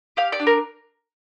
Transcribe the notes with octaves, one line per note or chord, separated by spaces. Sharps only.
G4 F5
D5
D4
A#4